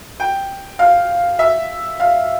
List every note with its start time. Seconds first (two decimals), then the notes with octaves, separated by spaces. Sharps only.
0.20 G5
0.79 F5
1.39 E5
2.00 F5